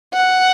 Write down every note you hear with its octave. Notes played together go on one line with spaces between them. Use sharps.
F#5